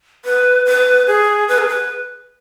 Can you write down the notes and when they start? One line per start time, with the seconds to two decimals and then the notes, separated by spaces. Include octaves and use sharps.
0.25 B4
0.66 B4
1.07 G#4
1.48 B4
1.58 G#4
1.68 B4